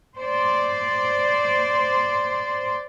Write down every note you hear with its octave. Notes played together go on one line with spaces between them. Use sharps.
C5 D5